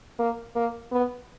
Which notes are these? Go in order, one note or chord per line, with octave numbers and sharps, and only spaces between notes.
A#3
A#3
B3